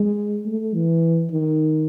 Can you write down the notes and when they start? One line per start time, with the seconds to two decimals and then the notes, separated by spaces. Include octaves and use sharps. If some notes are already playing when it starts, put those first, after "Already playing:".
Already playing: G#3
0.46 A3
0.74 E3
1.32 D#3